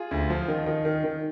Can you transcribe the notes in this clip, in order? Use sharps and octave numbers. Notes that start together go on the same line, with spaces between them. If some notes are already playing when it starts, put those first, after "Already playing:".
Already playing: F4 G#4
D2
F3
D#3
D#3
D#3
D#3